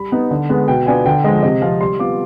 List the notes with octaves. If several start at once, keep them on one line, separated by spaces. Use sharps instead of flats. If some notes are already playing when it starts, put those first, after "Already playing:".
Already playing: G3 B5
B3 D#4
D3
G#3 B3
B2 G5
B3 D4 F4 G#5
D3 G5
F3 G#3 D#5
C3 D#5
F3 C4 F4 F5
G3 C6
B3 F4 D6